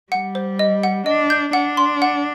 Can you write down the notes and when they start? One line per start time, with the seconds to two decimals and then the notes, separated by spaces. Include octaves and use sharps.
0.12 G3 F#5
0.35 C5
0.59 D#5
0.83 F#5
1.06 D4 D#5
1.30 G6
1.53 D4 F#5
1.77 C6
2.02 F#5